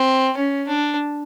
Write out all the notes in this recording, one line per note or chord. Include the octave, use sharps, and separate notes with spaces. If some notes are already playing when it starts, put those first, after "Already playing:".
Already playing: C4
C#4
D4